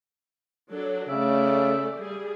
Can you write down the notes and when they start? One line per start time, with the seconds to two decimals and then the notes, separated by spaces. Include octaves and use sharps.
0.70 F#3 D4 A4
1.09 C#3 A3 D5 E5
1.98 G3 G#4